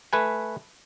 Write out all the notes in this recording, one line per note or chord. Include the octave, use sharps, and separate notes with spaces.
A3 B4 G#5